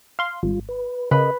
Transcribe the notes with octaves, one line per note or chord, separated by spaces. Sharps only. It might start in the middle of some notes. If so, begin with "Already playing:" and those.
F5 C6
G#1 G3 F4
B4
C#3 A#4 B4 D#5